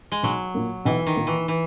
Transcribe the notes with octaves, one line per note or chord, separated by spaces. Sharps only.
G#3
B1 F#3
A#2 A#3
B1 E3
D#3
A#2 A#3
E3
E3